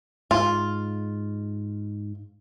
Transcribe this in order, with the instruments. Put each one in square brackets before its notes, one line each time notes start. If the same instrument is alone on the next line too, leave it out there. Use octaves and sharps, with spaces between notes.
[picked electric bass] G#2 [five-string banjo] F4